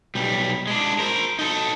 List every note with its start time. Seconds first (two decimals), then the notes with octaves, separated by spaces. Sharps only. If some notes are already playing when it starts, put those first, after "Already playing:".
0.15 B1 G3
0.67 G#3 D4
0.99 A#4 C5
1.39 D#4 A4